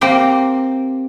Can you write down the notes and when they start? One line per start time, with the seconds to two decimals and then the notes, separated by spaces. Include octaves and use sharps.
0.01 A#3 C4 G4